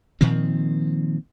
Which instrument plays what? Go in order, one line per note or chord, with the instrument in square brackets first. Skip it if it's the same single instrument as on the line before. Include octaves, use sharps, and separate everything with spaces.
[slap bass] A#2 D#3 F3 C4